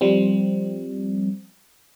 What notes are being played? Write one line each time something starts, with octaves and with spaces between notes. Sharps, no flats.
F3 G3 C4